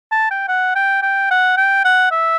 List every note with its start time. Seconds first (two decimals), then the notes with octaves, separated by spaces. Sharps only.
0.12 A5
0.30 G5
0.48 F#5
0.75 G5
1.02 G5
1.31 F#5
1.57 G5
1.85 F#5
2.11 E5